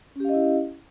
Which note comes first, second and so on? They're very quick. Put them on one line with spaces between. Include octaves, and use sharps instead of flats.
C#4 G4 F5 D#5 E4